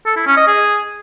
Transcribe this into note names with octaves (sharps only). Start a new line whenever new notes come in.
A4
E4
C#4
D#5
G#4